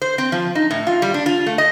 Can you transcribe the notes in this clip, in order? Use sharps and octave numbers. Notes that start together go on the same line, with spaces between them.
C5
C4
F3
D#4
A2
F4
G3
D4
F4
A3
D#5